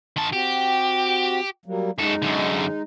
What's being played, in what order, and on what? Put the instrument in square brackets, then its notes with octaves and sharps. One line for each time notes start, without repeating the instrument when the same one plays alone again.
[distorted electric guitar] D#3 A5
[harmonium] C4 F#4 [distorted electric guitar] G4
[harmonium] F#3 G3 A#3
[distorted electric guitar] F#2 A4 [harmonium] G#3 D#4
[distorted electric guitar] F#2 D3